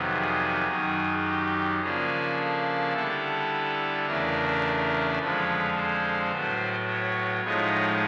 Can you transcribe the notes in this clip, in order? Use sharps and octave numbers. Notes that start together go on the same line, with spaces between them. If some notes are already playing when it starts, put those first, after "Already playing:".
Already playing: F2 C3 D#3 F#3 B3
G#4
F#2 D#3 F#3
G4
C#3 F3 A#3 D4 G#4
A4
D3 G3 B3 E4 A4
E2 C#3 E3 A3 D4 A#4
F2 D3 F3 G#3 B4
C5
A2 F#3 B3
C#5
A2 F3 G#3 B3 D#4